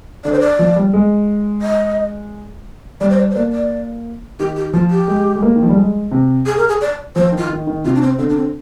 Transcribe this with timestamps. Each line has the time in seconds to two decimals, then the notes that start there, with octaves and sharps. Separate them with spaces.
0.24 D3 D5
0.32 C5
0.40 D5
0.59 F3
0.76 G3
0.93 G#3
1.62 D#5
3.01 G3 D5
3.10 C5
3.18 D5
3.30 C5
3.35 A#3 D5
3.53 D5
4.39 D#3 G4
4.56 G4
4.73 F3 F4
4.90 G4
5.08 G#3
5.36 G#3
5.42 A#3
5.56 D#3
5.62 F3
5.69 G3
5.76 G#3
6.11 C3
6.46 G#4
6.58 A#4
6.68 G#4
6.81 D5
7.15 F3 C5
7.32 D#3
7.38 F4
7.50 D#3
7.67 D#3
7.85 C3 F4
7.95 D4
8.02 C4
8.19 D3 C4
8.29 D4
8.36 C4